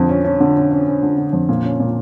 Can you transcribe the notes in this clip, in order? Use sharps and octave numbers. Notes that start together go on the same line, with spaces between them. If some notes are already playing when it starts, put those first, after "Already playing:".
Already playing: F2 D3 F3
C#4
C#4
D3
C#4
C#4
C#4
D3
D3
F2
A#2
C#4
A#2